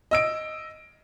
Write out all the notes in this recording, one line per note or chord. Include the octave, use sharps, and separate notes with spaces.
D#5 E6 D7